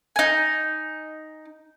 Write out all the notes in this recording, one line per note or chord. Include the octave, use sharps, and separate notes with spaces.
D#4 G#5